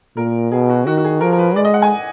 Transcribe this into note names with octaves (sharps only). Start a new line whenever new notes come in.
A#2 A#4
B2 G#4
F#4
D#3 F#4
F#4
G#4
F3 A#4
A#4
B4
G#3 D5
D#5
F#5
G#5